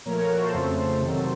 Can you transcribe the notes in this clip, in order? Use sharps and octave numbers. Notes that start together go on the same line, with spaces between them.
A#2 F3 A3 A#4 C#5
A#4 C#5
F#4 A#4
A4 C5
F2 C#3 F3 A3
C3 D#3 F#3